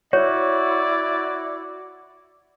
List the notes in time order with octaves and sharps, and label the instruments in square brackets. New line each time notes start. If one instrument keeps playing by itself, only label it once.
[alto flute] E4 [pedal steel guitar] F#4 [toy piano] C#5 [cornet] D5